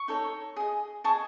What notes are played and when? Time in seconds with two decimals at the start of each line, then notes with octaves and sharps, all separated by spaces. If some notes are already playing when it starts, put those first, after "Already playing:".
Already playing: C#6
0.08 D#4 A4 C#5
0.56 G#4 D#5
1.04 G#4 D#5 A5 C#6